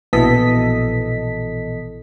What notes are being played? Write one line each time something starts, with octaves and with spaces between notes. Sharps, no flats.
A#1 B2 E3 A4 D#5 B6